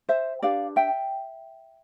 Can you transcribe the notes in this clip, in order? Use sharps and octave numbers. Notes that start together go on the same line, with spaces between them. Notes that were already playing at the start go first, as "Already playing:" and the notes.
C5 E5
D4 G4 B4 D5 F5
E5 G5